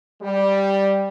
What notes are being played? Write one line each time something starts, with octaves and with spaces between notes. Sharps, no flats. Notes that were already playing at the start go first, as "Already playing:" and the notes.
G3